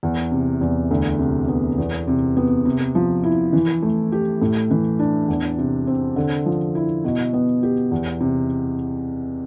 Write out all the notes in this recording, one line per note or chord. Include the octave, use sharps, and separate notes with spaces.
E2
C3
E2
D2
C3
B3
E2
C3
B3
C3
F3
E4
E3
A3
G4
A2
E3
D4
E2
C3
C4
D3
F3
E4
B2
B3
G4
E2
C3